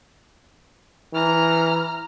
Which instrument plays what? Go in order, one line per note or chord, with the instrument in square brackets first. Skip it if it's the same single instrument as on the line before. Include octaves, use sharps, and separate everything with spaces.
[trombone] E3 [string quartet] A#5 F6